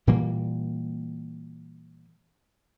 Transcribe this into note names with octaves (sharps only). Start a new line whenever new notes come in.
A#2 E3 G3 A#3